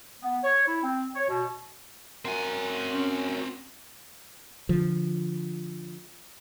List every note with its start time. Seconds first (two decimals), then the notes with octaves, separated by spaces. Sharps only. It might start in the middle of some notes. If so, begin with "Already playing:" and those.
0.22 B3
0.44 C#5
0.67 E4
0.84 C4
1.16 C#5
1.29 B2
2.25 C4 F#4 A#4 G#5
2.95 C#4
4.69 D3 F3